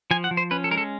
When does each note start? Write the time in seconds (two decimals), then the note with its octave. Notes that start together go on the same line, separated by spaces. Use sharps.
0.11 F3 G#5
0.24 F#5
0.31 F3
0.37 C5
0.51 C#4 B4
0.64 A4
0.71 G#3 A#4
0.77 A4